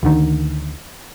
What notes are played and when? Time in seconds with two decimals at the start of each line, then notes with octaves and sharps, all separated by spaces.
0.03 D2 D3 D#3